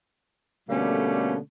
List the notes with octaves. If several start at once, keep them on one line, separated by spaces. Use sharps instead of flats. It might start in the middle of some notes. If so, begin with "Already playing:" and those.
B2 D3 G3 A3 A#3 C#4